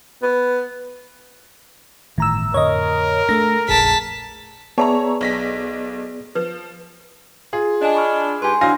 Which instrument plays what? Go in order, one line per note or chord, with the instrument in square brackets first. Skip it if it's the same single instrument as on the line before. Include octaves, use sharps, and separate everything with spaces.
[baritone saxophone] B3
[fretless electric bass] G1 D#3 E3 [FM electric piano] A2 A#5 E6
[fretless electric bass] F2 A2 D3 [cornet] A#4 [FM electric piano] C#5 D#5
[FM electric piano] A3 A#6 [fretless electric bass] D4
[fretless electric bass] F1 A#1 [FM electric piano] G#4 [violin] A5 B6
[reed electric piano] B3 G#4 D5 [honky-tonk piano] C#5 E5 A#5 [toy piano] A5
[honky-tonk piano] B1 A#6 B6
[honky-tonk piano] F3 [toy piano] B4
[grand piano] F4 G#4
[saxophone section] D4 [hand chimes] D#5 G#5
[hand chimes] B5 C#6 F6
[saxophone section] G#2 G4 B4 [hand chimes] G#5 C6
[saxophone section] E3 F#3 [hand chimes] D4 [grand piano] F5 G#5 A#6